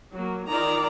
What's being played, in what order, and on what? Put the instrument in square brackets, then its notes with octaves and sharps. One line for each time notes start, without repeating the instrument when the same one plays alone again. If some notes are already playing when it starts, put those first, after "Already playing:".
[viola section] F#3 A#3
[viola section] D#3 F4 A#4 [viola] D5 A#5